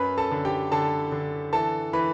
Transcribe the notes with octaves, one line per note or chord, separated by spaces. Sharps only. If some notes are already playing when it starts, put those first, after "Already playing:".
Already playing: F#2 B4 B5
A4 A5
D3
G4 G5
D3 A4 A5
D3
E3 A4 A5
E3 B4 B5